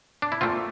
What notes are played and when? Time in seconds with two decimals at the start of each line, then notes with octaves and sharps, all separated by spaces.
0.22 D4
0.32 E4
0.41 A#2 A3 C4 F4